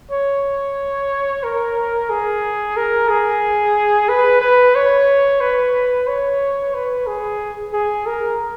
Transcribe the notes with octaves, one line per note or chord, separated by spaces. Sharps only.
C#5
A#4
G#4
A#4
G#4
B4
B4
C#5
B4
C#5
B4
G#4
G#4
A#4